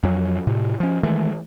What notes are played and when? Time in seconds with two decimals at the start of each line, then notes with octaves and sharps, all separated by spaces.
0.03 F2 F#3
0.47 A2 C3
0.80 F3 C#4
1.03 D#3 E3 G#3 A3